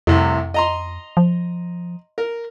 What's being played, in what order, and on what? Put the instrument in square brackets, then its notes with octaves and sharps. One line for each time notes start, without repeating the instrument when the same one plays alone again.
[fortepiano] C2 A2 C3 [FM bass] F2
[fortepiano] D#5 A#5 C6
[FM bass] F3
[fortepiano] A#4